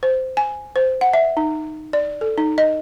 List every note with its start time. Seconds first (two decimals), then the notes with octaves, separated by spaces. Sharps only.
0.03 C5
0.37 G#5
0.76 C5
1.01 F#5
1.14 E5
1.37 D#4
1.93 D5
2.21 A4
2.38 D#4
2.58 D#5